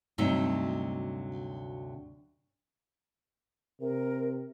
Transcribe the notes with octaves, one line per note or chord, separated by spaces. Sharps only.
D2 G2 C3 F#3 D#4 E5
C3 A#4